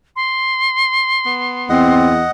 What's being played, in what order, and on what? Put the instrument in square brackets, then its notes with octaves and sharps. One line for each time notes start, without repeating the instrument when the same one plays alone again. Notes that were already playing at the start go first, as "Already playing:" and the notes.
[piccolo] C6
[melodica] B3
[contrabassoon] E2 [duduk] C4 [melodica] D#5 F#5